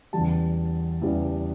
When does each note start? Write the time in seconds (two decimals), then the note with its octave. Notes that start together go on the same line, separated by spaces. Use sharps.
0.13 E2 C#3 E3 G3 A5
1.02 E2 C#3 E3 G3